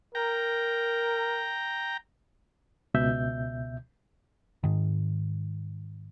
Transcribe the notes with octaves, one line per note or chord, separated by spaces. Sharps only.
A#4 G5 A#5
C#2 B2 E5 G6
G#2 D#3